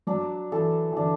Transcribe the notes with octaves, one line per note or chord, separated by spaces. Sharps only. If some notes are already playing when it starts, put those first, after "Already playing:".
F#3 D4
E3 A4
E3
D3 D4